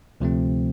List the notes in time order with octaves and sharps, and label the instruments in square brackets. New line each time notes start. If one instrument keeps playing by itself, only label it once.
[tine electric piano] D2 C3 F3 A3 C4